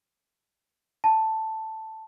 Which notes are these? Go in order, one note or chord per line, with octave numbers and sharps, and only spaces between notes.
A5